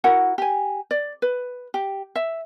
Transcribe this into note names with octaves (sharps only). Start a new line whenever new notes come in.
E4 F#4 A#4 F#5
G4 G#5
D5
B4
G4
E5